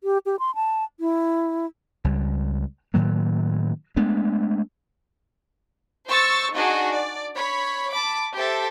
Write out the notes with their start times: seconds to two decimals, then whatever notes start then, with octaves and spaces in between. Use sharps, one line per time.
0.04 G4
0.26 G4
0.39 C6
0.55 A5
1.00 E4
2.04 C#2 G3
2.94 A2 D#3 F#3 A#3
3.96 G#3 A3 B3 D4
6.07 C5 C#6 E6 A6
6.55 D4 D#4 F#4 G#4 D#5
6.90 D5
7.35 C#5 B5
7.92 A5 B5 D6
8.35 G4 A4 C5 E5